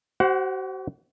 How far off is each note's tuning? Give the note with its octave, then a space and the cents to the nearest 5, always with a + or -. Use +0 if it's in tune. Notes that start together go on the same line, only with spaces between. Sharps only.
F#4 +40 C5 +0 F#5 +0